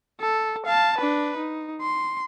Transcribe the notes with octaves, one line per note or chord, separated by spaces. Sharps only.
A4
F5 A5
D4 B4
D#4
C6